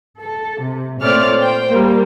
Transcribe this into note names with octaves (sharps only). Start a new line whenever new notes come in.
A4
C3
A#2 A3 C4 C#5 D5 F6
C5 G5
G3 A#3